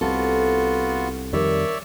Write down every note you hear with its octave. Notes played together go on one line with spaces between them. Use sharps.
C2 C3 B3 F4 F#4 A4
F2 D#3 G3 A#4 C#5 D5 E5